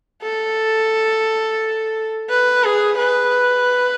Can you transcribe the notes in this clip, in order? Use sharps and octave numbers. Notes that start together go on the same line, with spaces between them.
A4
B4
G#4
B4